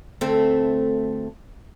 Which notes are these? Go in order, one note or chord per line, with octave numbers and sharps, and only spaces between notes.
D2 A3 C4